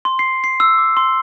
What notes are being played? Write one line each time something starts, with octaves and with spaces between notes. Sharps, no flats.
C6
C7
C7
E6
D6
C6